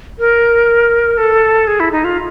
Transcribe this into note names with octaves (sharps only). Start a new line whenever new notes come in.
A#4
A4
G#4
E4
D#4
F4